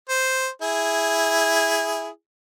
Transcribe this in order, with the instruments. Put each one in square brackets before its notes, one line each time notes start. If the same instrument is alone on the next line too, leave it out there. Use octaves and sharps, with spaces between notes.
[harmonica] C5
E4 G#4